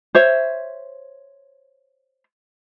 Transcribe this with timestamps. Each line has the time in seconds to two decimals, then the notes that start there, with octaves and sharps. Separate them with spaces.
0.15 C5 C#5 E5